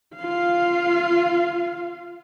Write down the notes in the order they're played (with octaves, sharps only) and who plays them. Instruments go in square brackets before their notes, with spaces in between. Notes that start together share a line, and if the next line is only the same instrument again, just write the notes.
[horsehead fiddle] F4 F5